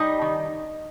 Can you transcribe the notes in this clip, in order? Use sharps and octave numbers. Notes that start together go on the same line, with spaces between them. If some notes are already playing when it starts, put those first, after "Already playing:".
Already playing: G3 D#4 D#5
D#3